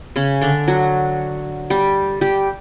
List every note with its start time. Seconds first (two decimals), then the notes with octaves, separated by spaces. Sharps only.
0.16 C#3 C#4
0.42 D3 D4
0.68 F#3 F#4
1.70 G3 G4
2.21 G3 G4